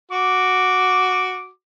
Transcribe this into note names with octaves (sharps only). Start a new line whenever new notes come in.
F#4 D6